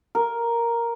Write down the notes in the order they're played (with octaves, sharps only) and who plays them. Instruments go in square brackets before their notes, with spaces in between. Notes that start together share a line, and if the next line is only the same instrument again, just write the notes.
[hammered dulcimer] A#4